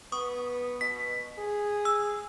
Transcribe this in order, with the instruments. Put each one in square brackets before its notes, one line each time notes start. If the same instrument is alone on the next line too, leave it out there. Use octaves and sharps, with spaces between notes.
[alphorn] B3 [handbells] C#6 D#6
[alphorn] B2 [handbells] B6
[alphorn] G#4
[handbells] E6